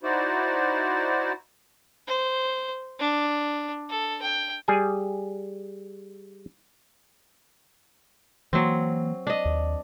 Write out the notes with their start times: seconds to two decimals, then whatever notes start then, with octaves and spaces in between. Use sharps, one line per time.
0.03 D#4 E4 F#4 C5 D5
2.07 C5
2.99 D4
3.90 A4
4.22 G5
4.68 G3 G#4 G#5
8.53 E3 F#3 A#3 C4
9.27 D4 D#5
9.45 D#2